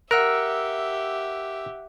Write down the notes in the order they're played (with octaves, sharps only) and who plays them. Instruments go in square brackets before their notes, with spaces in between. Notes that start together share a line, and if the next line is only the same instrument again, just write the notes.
[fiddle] G4 E5 [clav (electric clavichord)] A#4 [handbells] F#5 E6 F#6